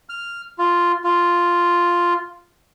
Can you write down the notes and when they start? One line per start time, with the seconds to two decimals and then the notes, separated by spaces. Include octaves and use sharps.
0.09 F6
0.58 F4
1.04 F4